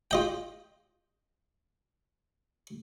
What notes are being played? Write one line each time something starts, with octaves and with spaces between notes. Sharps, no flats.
F4 D#5 G5